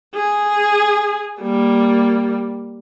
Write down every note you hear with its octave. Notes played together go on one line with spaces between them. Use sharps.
G#4
G3 A#3